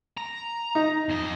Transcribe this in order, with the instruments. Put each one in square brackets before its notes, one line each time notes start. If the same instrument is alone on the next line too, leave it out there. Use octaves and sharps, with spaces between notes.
[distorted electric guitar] A#5
[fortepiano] D#4
[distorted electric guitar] F2 D#5